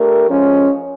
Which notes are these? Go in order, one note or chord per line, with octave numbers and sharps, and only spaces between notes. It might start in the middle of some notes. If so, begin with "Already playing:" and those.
Already playing: A3 D4 G4 A#4
F3 G#3 C#4